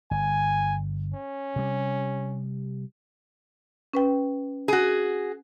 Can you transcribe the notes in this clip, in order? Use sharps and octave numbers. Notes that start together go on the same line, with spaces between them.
G1 G#5
C#4
C3 G3
C#4 B4 G5
F#4 G#4